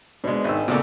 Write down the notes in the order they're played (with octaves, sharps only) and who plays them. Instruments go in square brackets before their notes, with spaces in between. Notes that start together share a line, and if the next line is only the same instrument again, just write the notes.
[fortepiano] B2 G#3 [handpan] D4 C5 D5
[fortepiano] G#1 D#3 E6
[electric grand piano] A#2 C#3 A4 [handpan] A3 B3 [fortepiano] F#4 D5